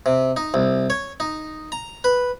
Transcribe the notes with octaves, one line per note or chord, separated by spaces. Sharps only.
C3
D#4
C2
C#5
D#4
A#5
B4